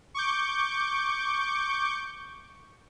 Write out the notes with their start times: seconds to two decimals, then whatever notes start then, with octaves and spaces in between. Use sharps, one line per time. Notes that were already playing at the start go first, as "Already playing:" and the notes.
0.14 C#6 D6 G6